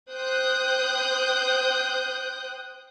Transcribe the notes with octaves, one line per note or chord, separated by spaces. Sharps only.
C5 G5 D#6 F#6 G6